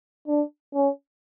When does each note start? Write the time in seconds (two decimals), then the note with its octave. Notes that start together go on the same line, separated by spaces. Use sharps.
0.28 D4
0.74 C#4